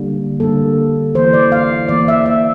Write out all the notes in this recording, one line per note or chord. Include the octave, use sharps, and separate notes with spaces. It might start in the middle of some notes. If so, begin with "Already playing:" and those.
Already playing: D3 G3 A#3
D3 G3 A#3 A4
E3 A#3 C5
D5
F5
E3 A#3 D5
E5
E5